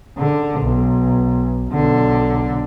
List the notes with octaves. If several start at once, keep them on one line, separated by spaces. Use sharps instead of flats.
D3
B1
B1 D3